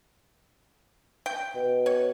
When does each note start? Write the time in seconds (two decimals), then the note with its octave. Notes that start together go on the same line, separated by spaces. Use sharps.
1.26 G5
1.55 B2
1.86 C#5